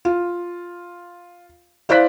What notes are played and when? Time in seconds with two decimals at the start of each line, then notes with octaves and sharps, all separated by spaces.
0.05 F4
1.89 E4 C5 D5 F5 F#6 B6